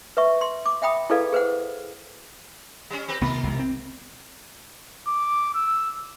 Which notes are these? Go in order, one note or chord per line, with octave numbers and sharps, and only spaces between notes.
B4 E5 C#6
C6
D6
E5 F#5 G5 B5 D#6
E4 G#4 A4 B4 D5 F5
G#4 B4 C5 F#5
G3 C#4
C4 G4 B4
C2 D#3 B3 F4 A#4
C2 C3 G#3
C4
D6
E6